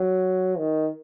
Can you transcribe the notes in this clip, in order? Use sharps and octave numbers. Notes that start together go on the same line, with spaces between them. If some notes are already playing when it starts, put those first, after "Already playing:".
Already playing: F#3
D#3